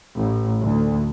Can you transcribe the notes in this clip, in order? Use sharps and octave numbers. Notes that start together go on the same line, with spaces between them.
A1
D2